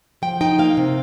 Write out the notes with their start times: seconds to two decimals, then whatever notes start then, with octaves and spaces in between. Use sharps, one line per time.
0.22 F3 G5
0.41 D#4 G5
0.59 A#3 F5
0.77 C3